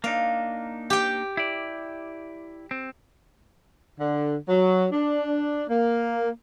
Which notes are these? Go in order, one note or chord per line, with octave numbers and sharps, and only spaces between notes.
A#3 D4 D#4 F5
G4 G5
E4 D5
C4
D3
F#3
D4
A#3